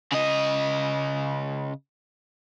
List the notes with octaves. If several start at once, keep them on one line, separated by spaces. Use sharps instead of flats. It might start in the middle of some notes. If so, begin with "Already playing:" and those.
C#3 D#5